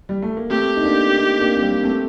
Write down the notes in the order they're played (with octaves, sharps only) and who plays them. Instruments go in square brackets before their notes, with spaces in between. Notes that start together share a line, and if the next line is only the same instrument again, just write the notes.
[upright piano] G3
A3
A#3
[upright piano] A3 C4 [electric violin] G4
[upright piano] D#4
A#3 D4
C4 D#4
A#3 D4
C4
G3 A#3
A3 C4